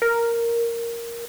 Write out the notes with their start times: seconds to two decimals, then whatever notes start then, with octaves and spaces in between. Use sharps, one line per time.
0.02 A#4